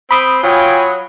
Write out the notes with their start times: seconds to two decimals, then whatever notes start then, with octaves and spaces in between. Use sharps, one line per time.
0.11 C4 B5 D#6
0.43 F#3 F4 G5 G#5